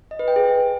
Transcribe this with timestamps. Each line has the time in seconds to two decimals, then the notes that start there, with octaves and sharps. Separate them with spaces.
0.11 D#5
0.19 B4
0.28 G5
0.36 G#4